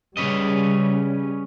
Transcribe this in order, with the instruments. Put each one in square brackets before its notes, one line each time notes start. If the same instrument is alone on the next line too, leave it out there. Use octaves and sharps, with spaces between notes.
[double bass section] C#3 G3 [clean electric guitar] C#4 B4 D#5